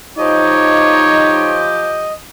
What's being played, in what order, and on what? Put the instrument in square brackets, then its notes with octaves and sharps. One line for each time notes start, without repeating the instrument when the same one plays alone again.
[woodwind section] F3 G4 [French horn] D#4 [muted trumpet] C#5 [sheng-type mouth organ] D#5